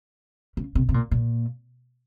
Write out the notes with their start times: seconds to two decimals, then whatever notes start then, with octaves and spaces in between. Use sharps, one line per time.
0.57 C#3
0.75 C3
0.89 C3
0.94 A#2
1.11 A#2